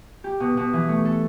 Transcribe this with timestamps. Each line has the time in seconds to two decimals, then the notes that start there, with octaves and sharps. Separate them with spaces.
0.24 G4
0.40 B2
0.57 B2
0.73 E3
0.89 A3
1.05 A4